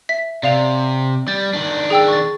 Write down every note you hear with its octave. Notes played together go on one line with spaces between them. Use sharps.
E5 B6
C3 D5 F5 F7
G3 A6
D#3 D4
G#4 G5 E6
C#6 A6